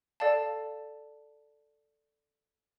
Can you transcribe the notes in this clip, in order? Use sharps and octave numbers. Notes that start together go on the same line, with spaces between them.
A4 D5 F5 A5